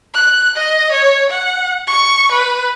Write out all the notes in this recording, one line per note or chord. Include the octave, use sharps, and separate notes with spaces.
F#6
D#5
C#5
F#5
C#6
B4